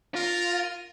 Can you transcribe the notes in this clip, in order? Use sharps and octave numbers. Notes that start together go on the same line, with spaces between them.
F4 A#4